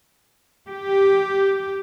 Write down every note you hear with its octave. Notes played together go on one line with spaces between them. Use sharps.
G4